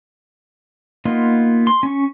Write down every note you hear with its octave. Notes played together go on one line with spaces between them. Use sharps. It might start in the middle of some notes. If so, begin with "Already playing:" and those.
A#3 B3 D#4 F4 C6
C6
C#4 C#6